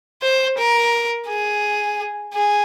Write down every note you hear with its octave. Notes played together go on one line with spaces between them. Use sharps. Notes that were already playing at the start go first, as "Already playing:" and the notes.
C5
A#4
G#4
G#4